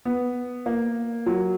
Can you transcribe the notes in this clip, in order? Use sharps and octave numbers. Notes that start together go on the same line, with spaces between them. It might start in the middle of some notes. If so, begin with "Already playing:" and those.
B3
A#3
F#3